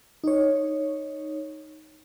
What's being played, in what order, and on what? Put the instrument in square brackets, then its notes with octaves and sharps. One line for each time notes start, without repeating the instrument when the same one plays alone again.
[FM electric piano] D#4 C#5